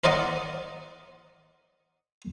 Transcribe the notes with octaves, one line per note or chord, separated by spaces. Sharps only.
A#4 C5 D5 D#5 F#5